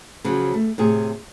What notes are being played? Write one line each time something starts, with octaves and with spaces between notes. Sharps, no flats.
C#3 F3 F#3
A3
A2 C3 G#4